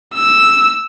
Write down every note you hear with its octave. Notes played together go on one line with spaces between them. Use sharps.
E6